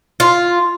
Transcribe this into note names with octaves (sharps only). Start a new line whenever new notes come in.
F4